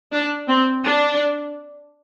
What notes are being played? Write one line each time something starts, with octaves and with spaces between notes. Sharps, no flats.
D4
C4
D4